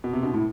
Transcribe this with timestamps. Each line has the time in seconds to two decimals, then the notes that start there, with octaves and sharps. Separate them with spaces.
0.04 B2
0.12 C3 B3
0.23 B2 D4
0.33 A2 E4